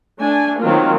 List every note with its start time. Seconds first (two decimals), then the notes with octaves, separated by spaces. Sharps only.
0.20 A3 D4 G#5
0.60 D#3 F#3 A#3 C4 F4